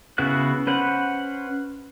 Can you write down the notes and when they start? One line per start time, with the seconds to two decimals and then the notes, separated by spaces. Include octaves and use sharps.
0.18 C#3 B3 E4 F#4 F#6
0.67 C#4 B4 C5 F#5